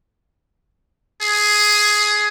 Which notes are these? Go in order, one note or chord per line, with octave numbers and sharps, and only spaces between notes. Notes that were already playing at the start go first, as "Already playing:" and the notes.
G#4